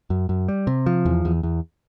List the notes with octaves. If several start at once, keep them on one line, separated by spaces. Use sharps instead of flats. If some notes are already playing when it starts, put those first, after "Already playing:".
F#2
F#2
G3
C3
F3
E2
E2
E2